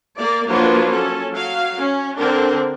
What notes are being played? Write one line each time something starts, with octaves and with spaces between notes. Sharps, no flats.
A#3 D5
F3 F#3 A#3 D4 F4 B4
C#4 A4
F#3 F5
C#4
D3 C4 D4 A#4